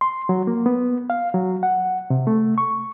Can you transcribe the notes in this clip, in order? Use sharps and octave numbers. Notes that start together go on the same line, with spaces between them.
C6
F#3
A#3
B3
F5
F#3
F#5
C3
A3
C#6